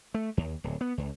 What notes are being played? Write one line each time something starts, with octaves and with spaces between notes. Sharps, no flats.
A3
D#2
D1
B3
C#2